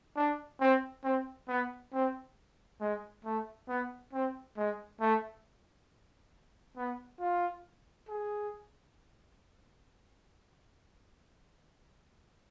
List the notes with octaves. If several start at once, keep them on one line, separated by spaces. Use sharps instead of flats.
D4
C4
C4
B3
C4
G#3
A3
B3
C4
G#3
A3
B3
F4
G#4